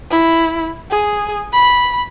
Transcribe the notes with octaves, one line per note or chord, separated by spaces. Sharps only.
E4
G#4
B5